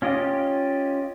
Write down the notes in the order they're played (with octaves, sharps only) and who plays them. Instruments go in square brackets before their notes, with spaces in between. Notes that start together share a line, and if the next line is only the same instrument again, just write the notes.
[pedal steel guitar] C#4 F4 G4 D#5